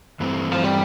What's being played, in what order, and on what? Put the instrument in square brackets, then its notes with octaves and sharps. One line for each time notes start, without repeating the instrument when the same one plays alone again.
[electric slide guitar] G2 E3 A3 C4
[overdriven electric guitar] F3
G3